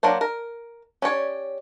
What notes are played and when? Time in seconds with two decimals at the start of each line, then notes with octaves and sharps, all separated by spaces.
0.03 F#3 A#3 D4 C5
0.21 A#4
1.02 C#4 G4 C#5 D5